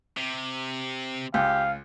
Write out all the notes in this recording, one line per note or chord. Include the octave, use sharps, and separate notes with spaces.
C3
C#2 G4 F5